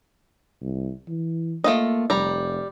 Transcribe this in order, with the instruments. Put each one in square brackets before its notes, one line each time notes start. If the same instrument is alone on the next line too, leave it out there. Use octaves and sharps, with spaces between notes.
[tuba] C2
E3
[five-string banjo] A3 F4 D#5 [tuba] A#3
[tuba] F1 [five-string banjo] G3 A#5